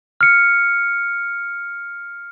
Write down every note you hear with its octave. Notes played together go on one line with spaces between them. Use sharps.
F6 C#7